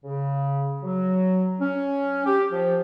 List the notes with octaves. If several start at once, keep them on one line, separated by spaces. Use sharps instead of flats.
C#3
F#3
C#4
G4
F3